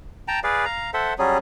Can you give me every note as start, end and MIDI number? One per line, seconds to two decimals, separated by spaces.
0.28 0.40 79
0.28 0.40 81
0.28 0.40 82
0.44 0.65 68
0.44 0.65 71
0.44 0.65 74
0.44 0.65 77
0.65 0.91 77
0.65 0.91 82
0.94 1.14 69
0.94 1.14 72
0.94 1.14 76
0.94 1.14 78
1.19 1.38 54
1.19 1.38 55
1.19 1.38 61
1.19 1.38 68